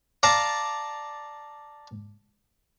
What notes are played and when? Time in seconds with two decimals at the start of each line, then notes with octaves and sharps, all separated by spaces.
0.23 D5 F5 A5 A#5